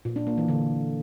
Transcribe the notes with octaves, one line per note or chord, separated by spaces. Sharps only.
A#2
D4
A#3
E3
D3